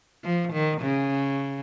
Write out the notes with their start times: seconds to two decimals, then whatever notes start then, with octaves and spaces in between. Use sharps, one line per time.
0.24 F3
0.53 D#3
0.81 C#3